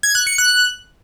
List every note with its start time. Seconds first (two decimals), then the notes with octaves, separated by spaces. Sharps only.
0.03 G#6
0.15 F#6
0.27 C#7
0.38 F#6